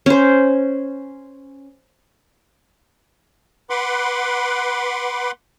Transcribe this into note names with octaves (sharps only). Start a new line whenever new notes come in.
C#4 C5
B4 F#5 B5 C6 D6